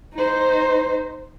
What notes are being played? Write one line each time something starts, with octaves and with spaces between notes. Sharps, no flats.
D#4 C5